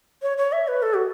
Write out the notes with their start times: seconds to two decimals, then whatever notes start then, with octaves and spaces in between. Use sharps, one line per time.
0.22 C#5
0.38 C#5
0.52 E5
0.68 B4
0.82 A4
0.94 F#4